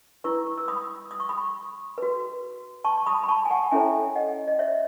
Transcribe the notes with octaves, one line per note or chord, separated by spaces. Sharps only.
E4 B4 C#6 E6
E6
B5 D#6
D#6
C#6
B5 D#6
F#4 B4
A5 C#6
C#6
B5 D#6
B5
A5 C#6
G#5
F#5 A5
C#4 E4 A4 C#5 E5 G#5
D#5 F#5
D#5
C#5 E5